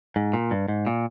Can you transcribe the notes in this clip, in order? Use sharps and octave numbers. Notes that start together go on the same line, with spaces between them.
G#2
A#2
G2
G#2
A#2